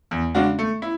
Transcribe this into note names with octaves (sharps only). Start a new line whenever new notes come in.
E2
C#3 G#3 D4 F#4
A3
E4